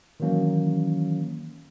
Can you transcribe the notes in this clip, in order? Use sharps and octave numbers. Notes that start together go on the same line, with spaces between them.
D#3 E3 F#3 A#3 C#4